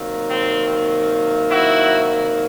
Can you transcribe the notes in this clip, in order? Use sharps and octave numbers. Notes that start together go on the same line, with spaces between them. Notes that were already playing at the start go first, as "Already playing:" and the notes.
Already playing: C3 D#3 F#3 A#3
C4
E4 F#4